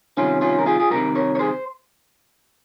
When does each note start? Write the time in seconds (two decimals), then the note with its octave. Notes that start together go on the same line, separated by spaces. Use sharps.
0.17 C2 C3 D#3 C#4 F4
0.41 C#4 F4
0.59 A#4
0.66 F4 G#4
0.80 G#4
0.90 C2 C3 D#3 G4 A#4
1.15 A#4 C#5
1.35 C#5
1.39 G#4 C5